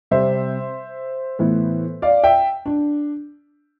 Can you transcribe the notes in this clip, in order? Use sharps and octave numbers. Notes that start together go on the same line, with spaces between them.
C3 G3 C4 C5 E5
A2 E3 B3
D5 F5
E5 G5
D4